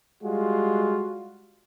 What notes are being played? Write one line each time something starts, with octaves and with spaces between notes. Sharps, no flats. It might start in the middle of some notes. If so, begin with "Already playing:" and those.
G3 G#3 F4 F#4